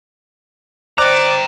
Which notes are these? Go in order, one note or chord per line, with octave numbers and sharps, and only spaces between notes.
C5 D5 G5 A#5 D6 F#6